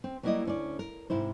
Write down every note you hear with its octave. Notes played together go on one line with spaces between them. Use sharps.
C4
F#3 G3 A#3 E4 D5 D#5
D2 C#4 D5
A#4
G#2 C3 E4 C5